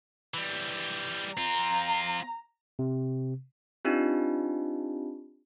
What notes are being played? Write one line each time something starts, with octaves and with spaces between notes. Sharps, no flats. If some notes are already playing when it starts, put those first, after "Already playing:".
E3 G3
C4 F4 A#5
C3
C4 D4 D#4 F4 G4